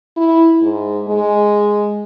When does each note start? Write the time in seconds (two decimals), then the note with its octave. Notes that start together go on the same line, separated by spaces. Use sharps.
0.16 E4
0.61 G#2
1.08 G#3